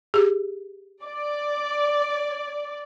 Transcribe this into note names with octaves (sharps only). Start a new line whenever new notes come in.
G4 G#4
D5